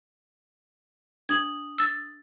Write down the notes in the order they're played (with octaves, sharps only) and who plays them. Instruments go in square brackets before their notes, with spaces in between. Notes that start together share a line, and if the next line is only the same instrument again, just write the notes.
[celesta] D4 D#6 F#7 [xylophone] G#6
[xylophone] E6 A6